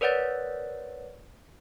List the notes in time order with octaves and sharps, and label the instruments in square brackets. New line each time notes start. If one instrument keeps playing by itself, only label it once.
[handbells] A#4 B4 C#5 D5 F#5 A6